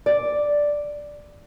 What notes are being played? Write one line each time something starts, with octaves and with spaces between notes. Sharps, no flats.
D5